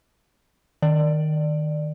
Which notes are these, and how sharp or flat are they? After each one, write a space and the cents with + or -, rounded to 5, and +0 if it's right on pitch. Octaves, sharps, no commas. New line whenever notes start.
D#3 -15 D5 +10